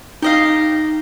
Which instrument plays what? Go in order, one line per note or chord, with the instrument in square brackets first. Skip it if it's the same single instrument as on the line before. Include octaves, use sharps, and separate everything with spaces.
[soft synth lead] D#4 [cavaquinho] G4 D#5 F5